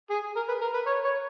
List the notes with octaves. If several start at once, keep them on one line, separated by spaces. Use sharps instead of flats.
G#4
A#4
B4
A#4
B4
C#5
C#5